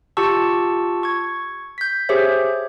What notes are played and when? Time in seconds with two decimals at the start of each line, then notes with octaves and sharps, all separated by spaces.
0.17 F4 G4 A5 C#6 E6
1.03 C#6 G#6
1.78 G6 B6
2.09 G4 G#4 C5 C#5 E5